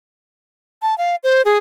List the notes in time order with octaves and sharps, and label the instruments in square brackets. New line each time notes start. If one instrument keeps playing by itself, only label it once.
[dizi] A5
F5
C5
G#4